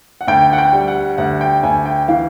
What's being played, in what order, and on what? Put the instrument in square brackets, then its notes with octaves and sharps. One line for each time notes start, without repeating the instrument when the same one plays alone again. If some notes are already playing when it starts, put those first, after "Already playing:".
[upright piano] F#5
D2 G5
F#5
G5
G3
F#5
D2 F#5
G5
D2 G#5
G5
E3 F5